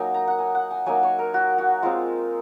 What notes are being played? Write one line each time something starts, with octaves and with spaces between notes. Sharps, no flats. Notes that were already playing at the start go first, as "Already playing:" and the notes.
Already playing: F#3 A#3 D#4 G#5
A#5
F#5
G#5
F#5
G#5
F#3 A#3 D#4 G#5
C#5
A#4
F#4
F#4
G#3 C4 D#4 F4